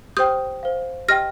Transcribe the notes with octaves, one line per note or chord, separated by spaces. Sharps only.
G4 C5 G5 D#6 G6
C5 F5
G4 D#5 G5 F6 A#6